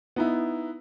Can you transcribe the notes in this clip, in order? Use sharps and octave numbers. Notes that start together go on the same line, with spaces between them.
B3 D#4 E4